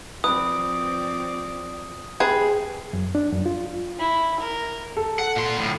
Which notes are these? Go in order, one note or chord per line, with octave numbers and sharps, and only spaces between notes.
F3 C4 B4 D5 D#6
C4 G#4 B4
F#2
D4
F#2
F4
E4
A#4
A4
F#5
A#2 C6
D2 A2